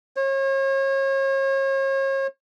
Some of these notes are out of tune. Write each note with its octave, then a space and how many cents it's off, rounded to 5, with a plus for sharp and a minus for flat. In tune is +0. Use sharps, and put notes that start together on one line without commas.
C#5 -40